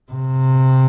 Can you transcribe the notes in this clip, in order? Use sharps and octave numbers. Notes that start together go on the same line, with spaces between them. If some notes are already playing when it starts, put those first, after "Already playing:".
C3